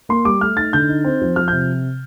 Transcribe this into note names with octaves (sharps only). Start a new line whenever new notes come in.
A#3 C6
G3 D6
A3 F6
D#4 A6
D3 G6
D#4
C4
F3
F3 F6
G6
C3